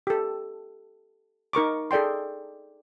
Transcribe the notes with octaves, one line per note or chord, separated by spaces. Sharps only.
G4 A4
D#4 A#4 C#6 D6
G#4 A4 D5 G5 C6